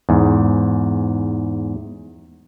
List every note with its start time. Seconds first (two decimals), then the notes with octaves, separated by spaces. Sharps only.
0.09 E2 G#2